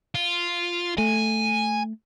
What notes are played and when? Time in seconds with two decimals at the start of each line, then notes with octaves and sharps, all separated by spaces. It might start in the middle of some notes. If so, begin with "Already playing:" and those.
0.15 F4
0.98 A3 G#5